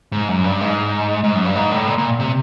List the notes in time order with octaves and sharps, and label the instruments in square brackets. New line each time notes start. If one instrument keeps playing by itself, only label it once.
[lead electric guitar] G#2
F#2
G2
G#2
G#2
F#2
G2
G#2
A2
A#2
A#2
C3